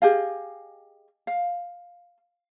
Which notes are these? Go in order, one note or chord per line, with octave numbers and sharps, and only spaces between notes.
G4 G#4 D#5 F5
F5